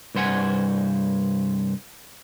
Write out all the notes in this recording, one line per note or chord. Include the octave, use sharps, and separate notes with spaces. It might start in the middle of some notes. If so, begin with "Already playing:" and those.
C2 G2 C5 F#5 G#5